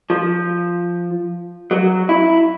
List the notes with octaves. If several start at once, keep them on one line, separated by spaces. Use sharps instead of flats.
F3
F#3
E4